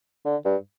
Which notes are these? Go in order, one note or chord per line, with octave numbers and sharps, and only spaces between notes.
D3
G2